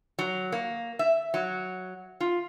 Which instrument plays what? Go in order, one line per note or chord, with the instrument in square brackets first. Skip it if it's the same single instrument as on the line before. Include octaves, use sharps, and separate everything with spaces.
[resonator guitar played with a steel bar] F#3
A#3
E5
F#3
F4